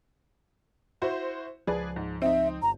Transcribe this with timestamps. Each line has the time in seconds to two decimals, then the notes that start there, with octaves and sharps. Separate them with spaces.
1.02 E4 F#4 C5
1.67 C#2 F3 G#4 B4 D5
1.96 G#2
2.22 C4 D#4 E5
2.62 G1 A#5